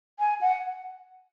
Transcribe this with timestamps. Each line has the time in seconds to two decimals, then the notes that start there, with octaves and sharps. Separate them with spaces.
0.19 G#5
0.41 F#5